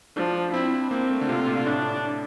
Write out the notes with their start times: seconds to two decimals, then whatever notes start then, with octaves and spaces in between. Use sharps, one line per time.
0.16 F3 D4
0.54 C4 E4
0.91 A#3 C4
1.11 A3
1.21 D3
1.29 C3 F4
1.47 A#2
1.66 A2 D4